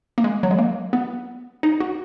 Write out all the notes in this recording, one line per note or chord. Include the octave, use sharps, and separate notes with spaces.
A#3
G#3
F#3
G#3
A#3
B3
D#4
F#4